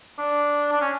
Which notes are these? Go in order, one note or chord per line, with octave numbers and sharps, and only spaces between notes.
D4
D4
C#4